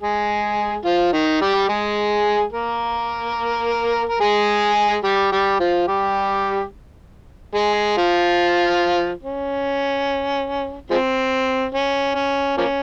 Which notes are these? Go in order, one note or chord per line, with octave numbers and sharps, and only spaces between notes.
G#3 G#4
F3 F4
D#3 D#4
G3 G4
G#3 G#4
A#3 A#4
A#4
G#3 G#4
G3 G4
G3 G4
F3 F4
G3 G4
G#3 G#4
F3 F4
C#4
F3 G#3 C4
C#4
C#4
F3 A#3 C#4